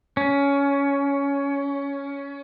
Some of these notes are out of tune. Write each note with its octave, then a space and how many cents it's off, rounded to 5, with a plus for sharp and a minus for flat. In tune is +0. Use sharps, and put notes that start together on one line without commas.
C#4 +15